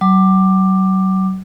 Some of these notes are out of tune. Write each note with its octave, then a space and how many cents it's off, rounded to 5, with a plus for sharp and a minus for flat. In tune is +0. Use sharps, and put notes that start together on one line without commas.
F#3 +40 D6 +15